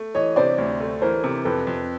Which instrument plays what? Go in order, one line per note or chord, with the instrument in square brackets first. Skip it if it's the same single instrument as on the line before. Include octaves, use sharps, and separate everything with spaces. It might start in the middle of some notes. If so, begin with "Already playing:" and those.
Already playing: [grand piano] A3
[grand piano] E3 [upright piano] C#5 D#5
[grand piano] C3 [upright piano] C5 D5
[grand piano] D2
A3
[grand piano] E3 [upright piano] A#4 C5
[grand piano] C3
[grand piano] F2 [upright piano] A4 B4
[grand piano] F2